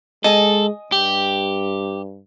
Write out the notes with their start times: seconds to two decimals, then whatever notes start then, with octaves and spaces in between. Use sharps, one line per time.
0.24 G#3 A4 D#5 G#5
0.92 G2 G4